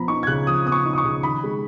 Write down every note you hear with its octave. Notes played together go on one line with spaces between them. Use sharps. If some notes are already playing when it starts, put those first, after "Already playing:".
Already playing: F3 B3 A#5 B5
D#4 C#6
G#6
C#3 F#6
F3 D#6
B3 D#6
C#6
D#4
D#6
C#6
C#3
D#3 B5
G#3